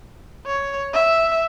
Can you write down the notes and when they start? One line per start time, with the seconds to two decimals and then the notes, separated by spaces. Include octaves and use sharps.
0.47 C#5
0.94 E5